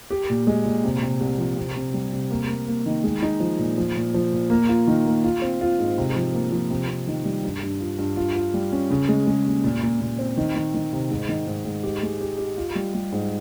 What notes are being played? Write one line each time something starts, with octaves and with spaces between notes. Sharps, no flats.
G4
A#2
G#3
A#2
C3
C3
C2
F3
C3
C3
G3
C3
A#3
A#3
A#3
D#3
G#3
D#4
F3
A#2
F3
A#2
F3
A#2
A#3
F4
D#3
A#3
F4
C4
F4
G#2
C3
F3
A#3
F3
C3
C3
D#3
G3
G2
G2
F4
G2
F4
F4
G3
C#4
C#3
G#3
G#3
D#2
A#2
A#2
A#2
C4
D#3
D#3
D#3
C3
G#2
D#3
G#2
G#2
G4
G#3
G4
G4
F4
G3
G3
G#2